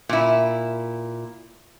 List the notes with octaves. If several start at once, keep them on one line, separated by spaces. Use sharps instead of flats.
A#2 E4